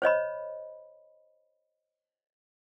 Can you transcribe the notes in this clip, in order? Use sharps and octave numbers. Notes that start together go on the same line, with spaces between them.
C5 C#5 D#5 B5